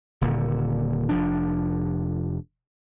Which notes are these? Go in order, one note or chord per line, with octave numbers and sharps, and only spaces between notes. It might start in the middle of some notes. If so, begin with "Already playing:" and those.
D#1 A#2 D3
F1 F3 D4